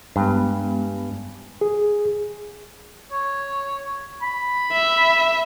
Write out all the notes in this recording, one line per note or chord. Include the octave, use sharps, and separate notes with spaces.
G2 G#3 B3
G#4
C#5
B5
E5